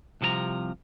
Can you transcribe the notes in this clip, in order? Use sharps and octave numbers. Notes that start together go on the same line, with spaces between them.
C2 C3 F3 A4 A#5